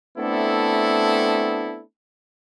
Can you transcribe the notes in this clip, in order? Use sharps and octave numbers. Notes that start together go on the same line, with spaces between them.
A3 B3 C4 D4 E4 A4